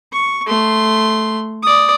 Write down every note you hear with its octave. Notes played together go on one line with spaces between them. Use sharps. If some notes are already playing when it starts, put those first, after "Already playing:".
C#6
A3 C6
D5 D#6